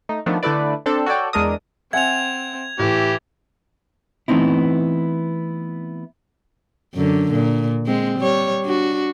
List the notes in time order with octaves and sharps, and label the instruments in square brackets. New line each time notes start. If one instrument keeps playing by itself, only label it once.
[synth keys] A3 D#4
D#3 F3 A3 B3 D4
D3 A3 E4 A4 B4 D5
C4 D4 A4
F#4 A4 C#5 D5 G5
E2 G#3 D4 A#4 D#6
[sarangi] C4 [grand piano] E5 F#5 G#5 [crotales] G#6 F7
[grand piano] A2 [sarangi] E3 [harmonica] G4
[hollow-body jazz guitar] E3 A3 B3 C4 D#4 E4
[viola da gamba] F#2 D3
A#2
G#3 C4
G3 C#5
D4 F#4